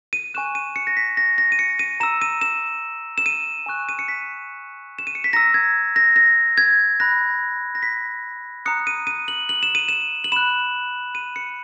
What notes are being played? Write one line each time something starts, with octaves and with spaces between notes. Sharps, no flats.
D#7
G#5 C#6 F#6 E7
D#7
C#7
A#6
B6
A#6
A#6
D#7
C#7
D#7
A#5 E6 E7
D#7
E7
E7
D#7
G#5 C#6 F#6
D#7
C#7
B6
E7
D#7
C#7
B6
A#5 E6 A#6
G#6
A#6
A#6
G#6
B5 F#6 A#6
A#6
B6
A#5 D#6 F#6 C#7
D#7
D#7
F#7
F#7
E7
D#7
E7
F#7
B5 F#6 E7
D#7
C#7